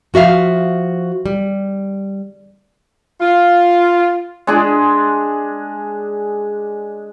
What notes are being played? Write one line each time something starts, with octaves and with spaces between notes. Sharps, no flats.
F3 F#4 E5 F5
G3
F4
G#3 D4 G#4